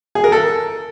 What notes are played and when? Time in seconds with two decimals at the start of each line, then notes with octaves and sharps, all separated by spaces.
0.15 G#4
0.24 A#4
0.32 A4